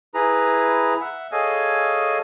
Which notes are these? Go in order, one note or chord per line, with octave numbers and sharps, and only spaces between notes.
E4 G#4 B4 A#5
E5 F#5
G#4 A4 C#5 D#5 F5 G#5